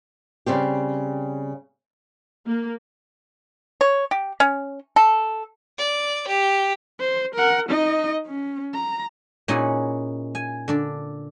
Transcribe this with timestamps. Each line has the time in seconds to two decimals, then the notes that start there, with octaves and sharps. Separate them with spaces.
0.46 C#3 G3 C4 G4
2.46 A#3
3.81 C#5
4.11 G4
4.40 C#4
4.96 A4
5.78 D5
6.28 G4
7.00 C5
7.35 A#4 F#5
7.69 D#4 D#5
8.26 C#4
8.74 A#5
9.48 A#2 C#4 D#4 E4 G#4 F#5
10.35 G#5
10.68 D3 D4 D5